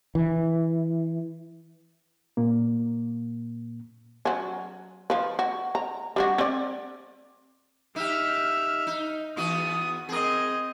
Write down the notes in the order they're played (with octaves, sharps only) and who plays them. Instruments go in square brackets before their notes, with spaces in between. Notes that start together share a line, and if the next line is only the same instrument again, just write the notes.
[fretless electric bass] E3
[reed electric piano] A#2 A#3
[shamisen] F#3 C#4
F3 B4
F#4
A#5
G3 D4 F#4
C4 D5
[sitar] D#4 G4 [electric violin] E5 F6
[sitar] D#4
[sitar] E2 B3 F#4 [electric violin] D#6
[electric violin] C4 D#5 [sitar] G#4 A#4